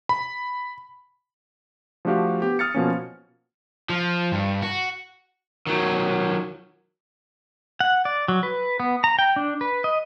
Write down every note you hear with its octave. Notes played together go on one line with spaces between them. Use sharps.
B5
F3 A3 D4 F#4 G4 F5
B3 G4
D#6 F6 A6 C#7
B2 F3 A#3 C#4
F3
G2
F#4
D#3 F#3
F#5
D5
F#3
B4
B3
A#5
G5
D4
B4
D#5